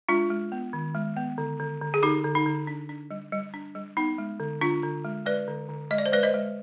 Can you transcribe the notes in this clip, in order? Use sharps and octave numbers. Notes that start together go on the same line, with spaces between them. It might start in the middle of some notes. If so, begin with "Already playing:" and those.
G#3 D4 F4
G#3
B3
D#3
G#3
B3
D3
D3
D3
G#4
D3 D#4 G4
D3
D#4
D3
D4
D4
G3
G3
D4
G3
B3 D#4
G#3
D3
D3 D4 F4
D3
G#3
G#3 B4 D5
D3
D3
G#3 D#5
D5
C5
G#3 B4 D5
C5 D#5
G#3